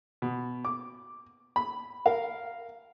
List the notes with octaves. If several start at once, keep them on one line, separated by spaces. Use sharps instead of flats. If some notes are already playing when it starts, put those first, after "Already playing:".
B2
D6
B5
A#4 F5